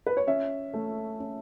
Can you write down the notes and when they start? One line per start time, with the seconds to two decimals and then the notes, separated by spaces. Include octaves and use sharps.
0.06 B4
0.17 C#5
0.27 C#4 E5
0.74 A3
1.19 C#4